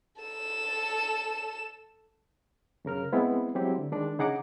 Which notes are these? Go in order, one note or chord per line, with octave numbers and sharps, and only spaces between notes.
A4 E7
F#2 C#3 A#4 F6
G#3 B3 C4 E4
F#3 G#3 C4 E4 G4
D3
D#3 G#3 D4 D5
C#3 D#4 G#4 F#5 A#5 D6